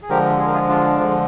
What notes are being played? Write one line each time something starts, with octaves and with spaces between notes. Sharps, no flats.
G#4
D3 F3 G#3 G4 A#4
G#4
A#4
F4 G#4
D4 F4
D3 F3 G#3